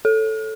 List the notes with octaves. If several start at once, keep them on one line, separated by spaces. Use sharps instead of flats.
A4